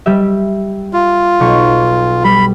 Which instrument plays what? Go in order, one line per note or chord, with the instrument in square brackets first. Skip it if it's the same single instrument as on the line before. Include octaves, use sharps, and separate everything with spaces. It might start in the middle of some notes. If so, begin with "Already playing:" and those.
[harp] G3 G4 E5
[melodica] F4
[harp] B1 C#6
[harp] G3 [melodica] B5